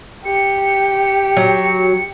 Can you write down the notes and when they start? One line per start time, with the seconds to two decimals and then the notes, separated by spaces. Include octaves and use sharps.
0.25 G4 C#7
1.37 F#3